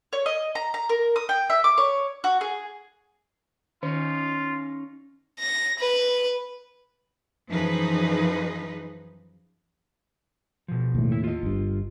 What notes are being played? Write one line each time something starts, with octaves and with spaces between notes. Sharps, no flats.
C#5
D#5
A#5
A#5
A#4
D#6
G5
E5
D6
C#5
F#4
G#4
D#3 C#4 D#4 F4
A#6
B4
F#2 E3 F3 D#4 G#4 B4
B2 F3
D#2 A2
E4
F4 D#5
G1 G2